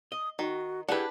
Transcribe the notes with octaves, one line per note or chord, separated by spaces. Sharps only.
D#5 D#6
D#3 F#4
D4 E4 G4 G#4 B4 F#5